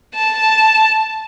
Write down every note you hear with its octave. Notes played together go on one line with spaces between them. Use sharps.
A5